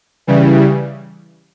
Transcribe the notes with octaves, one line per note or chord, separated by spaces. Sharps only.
C#3 E3 G3